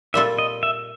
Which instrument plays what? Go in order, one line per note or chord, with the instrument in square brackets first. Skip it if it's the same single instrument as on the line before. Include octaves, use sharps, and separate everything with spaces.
[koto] A#2 G3 C4 F4 A4 [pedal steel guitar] E5
[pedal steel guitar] D#5
E5